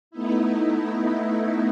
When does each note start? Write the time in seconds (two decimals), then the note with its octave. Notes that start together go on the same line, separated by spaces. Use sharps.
0.11 A3 B3 D#4 E4